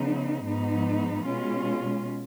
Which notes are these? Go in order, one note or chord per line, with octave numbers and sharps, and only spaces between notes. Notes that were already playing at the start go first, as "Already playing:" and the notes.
Already playing: C#3 F3 B3 D#4
G#2 F3 B3 D#4
B2 G#3 C#4 F4